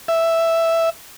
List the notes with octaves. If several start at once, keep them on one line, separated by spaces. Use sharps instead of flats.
E5